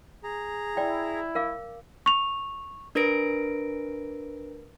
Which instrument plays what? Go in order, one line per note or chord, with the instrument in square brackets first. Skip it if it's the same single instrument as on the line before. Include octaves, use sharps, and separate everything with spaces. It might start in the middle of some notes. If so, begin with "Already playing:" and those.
[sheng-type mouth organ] G#4 A#5
[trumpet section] E4 [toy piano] D5 G5
[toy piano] A#4 F5 D6
[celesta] C#6 F7
[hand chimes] D4 A#4 B4 A#6 D7